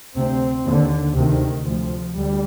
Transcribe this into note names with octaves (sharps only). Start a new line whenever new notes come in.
D2 C3 C4
D#2 D3
D2 C3 D#3
D2 C3 F3
D2 G3